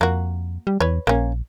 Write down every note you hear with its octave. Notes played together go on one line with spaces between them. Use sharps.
F2 A#3 F#4
G3
E2 B4 C#5
A#1 A#3 C#4